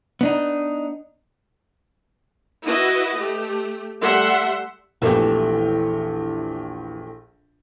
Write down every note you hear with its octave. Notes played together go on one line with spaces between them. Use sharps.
B3 D4 D#4
E4 F#4 B4 D#5
A3 G4
G3 A3 E5 F#5 C6
A#1 E2 E3 A3 G4